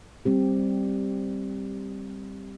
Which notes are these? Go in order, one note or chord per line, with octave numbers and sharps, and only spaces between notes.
G3 C4 G4